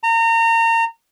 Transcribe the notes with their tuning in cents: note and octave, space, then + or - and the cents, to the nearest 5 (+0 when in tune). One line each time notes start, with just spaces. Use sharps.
A#5 -30